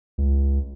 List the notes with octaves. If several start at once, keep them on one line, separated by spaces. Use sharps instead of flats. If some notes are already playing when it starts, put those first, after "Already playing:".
C#2